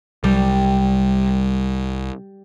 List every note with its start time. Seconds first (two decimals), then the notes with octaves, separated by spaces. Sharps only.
0.24 C2 G3